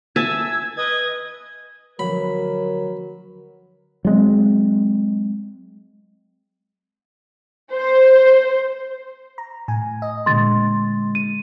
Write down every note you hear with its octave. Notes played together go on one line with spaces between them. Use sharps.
E5 G#5 A5 E6 G#6
B4 D#5 G#6
D2 F3 F#3 A#4 B4 B5
F#3 G#3 C4
C5
A#5
A2 G#5
D#5
A#2 D3 G#3 C6 A6
D#7